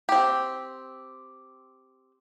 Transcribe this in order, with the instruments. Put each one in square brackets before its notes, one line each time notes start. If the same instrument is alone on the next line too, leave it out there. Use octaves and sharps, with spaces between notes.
[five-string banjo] C4 G4